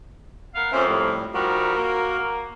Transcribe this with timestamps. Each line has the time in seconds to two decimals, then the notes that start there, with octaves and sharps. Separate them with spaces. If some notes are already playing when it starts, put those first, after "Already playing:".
0.54 B3 A#4 F5
0.72 F2 A#3 C#4 C5 E5
0.88 A2 G3
1.34 D#3 F3 G3 F#4 A#4
1.75 A#3